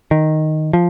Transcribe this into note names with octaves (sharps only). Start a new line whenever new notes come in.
D#3
F3